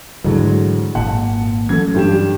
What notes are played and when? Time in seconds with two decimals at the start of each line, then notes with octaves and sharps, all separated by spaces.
0.24 D2 G#2 E3 F#3 G#3
0.95 G#1 A#2 F#5 A5
1.69 E3 F#3 A3 C#4 G#6
1.95 G2 G4 E7